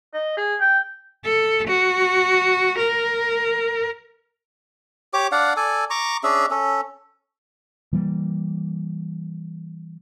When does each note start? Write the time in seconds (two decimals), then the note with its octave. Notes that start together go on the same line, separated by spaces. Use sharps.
0.14 D#5
0.37 G#4
0.61 G5
1.25 A4
1.68 F#4
2.79 A#4
5.14 G4 C#5 D6
5.32 D4 D5 F5 F#5
5.57 A4 D5 G#5
5.90 A#5 C#6 D6
6.24 C#4 D4 G#4 E5
6.51 C#4 A4
7.93 E3 G3 A#3